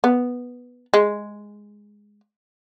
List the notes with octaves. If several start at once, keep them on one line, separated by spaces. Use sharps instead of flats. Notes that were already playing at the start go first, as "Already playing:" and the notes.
B3
G#3